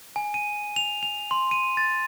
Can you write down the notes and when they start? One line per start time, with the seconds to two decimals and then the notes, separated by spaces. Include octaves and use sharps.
0.16 G#5
0.34 D#7
0.76 F7
1.03 F7
1.31 C6
1.51 D#7
1.77 A6